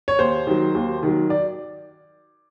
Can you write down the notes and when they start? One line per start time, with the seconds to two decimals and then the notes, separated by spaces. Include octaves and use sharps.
0.08 C#5
0.19 D#2 C5
0.47 D#3 F#3
0.75 D#2
1.03 D#3 F#3
1.30 D5